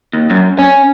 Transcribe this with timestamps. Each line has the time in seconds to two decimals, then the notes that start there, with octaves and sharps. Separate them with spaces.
0.13 D#2
0.30 F#2
0.59 C#4